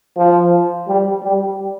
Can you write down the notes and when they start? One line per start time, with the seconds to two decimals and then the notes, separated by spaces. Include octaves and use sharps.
0.17 F3
0.88 G3
1.23 G3